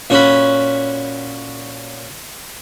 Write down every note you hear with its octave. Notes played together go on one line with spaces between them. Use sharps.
A#2 C#4 F#4 B5